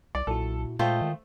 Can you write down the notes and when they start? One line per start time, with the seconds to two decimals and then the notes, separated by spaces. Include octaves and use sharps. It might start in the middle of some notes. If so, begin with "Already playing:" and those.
0.15 C2 D5
0.27 B1 A#2 E4 F#4 A4
0.79 A#2 G#3 A3 F4 C5 D#5 G5
1.01 D#3